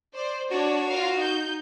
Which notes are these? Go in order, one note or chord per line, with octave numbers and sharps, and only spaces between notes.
C5 D5
D4 F#4 C#5 D5
F4 A#4 F5
D#4 G6